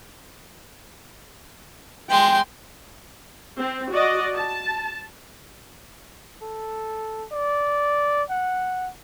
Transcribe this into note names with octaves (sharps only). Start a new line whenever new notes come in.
G#3 G5 C6
C4
F#4 D5 D#5
A5
A4
D5
F#5